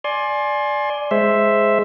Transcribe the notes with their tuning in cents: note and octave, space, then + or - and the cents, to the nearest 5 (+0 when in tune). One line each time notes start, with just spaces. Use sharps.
D5 +0 G#5 +15 C6 +25
G#3 +0 C5 +0 E5 +0